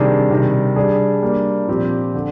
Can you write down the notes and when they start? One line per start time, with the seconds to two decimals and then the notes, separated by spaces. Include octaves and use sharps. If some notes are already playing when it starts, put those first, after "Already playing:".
Already playing: C3 D#3 G3 D4 G#4
0.30 C3 D#3 G3
0.76 G3 D4 G#4
1.22 G3 A#3 D4
1.68 A#2 F3 C4 G4
2.15 D3